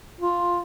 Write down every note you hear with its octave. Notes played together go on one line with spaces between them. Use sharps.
F4